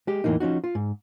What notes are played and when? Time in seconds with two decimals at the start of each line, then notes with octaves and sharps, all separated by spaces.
0.07 G#3 G4
0.24 E2 A2 D3 E3 A#3 D#4
0.40 F3 C#4 D#4 F#4
0.64 F4
0.75 G#2